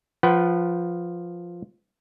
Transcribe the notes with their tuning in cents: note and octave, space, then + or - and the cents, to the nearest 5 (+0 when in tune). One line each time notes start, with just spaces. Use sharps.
F3 +0 B4 +0 F#5 +30